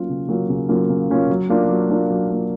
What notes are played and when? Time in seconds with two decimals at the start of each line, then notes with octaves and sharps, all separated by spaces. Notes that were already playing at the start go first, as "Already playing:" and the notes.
Already playing: F#3 A#3 C#4 F4
0.09 C#3
0.29 F#3 A#3 C#4 F4
0.49 C#3
0.69 F#3 A#3 C#4 F4
0.89 C#3
1.09 F#3 A#3 C#4 F4
1.29 F#3
1.50 A#3 D4 F4
1.69 F#3
1.89 A#3 D4 F4
2.10 F#3
2.29 A#3 D4 F4